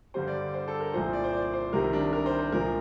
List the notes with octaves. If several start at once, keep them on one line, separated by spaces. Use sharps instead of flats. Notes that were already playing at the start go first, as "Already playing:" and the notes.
G2 D3 G3 C5
D5
C5
A4
A#4
C2 A#2 F3 C5
D5
C5
D5
C5
C2 C3 D#3 G3 A#4
D4
A#4
C5
C5
C2 A#2 F3 A#4